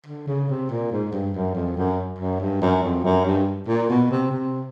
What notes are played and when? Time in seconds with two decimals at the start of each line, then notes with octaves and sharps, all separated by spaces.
0.06 D3
0.27 C#3
0.50 C3
0.70 A#2
0.92 G#2
1.12 G2
1.34 F#2
1.55 F2
1.77 F#2
2.19 F#2
2.41 G2
2.62 F#2
2.83 F2
3.04 F#2
3.25 G2
3.67 A#2
3.90 B2
4.11 C3
4.32 C3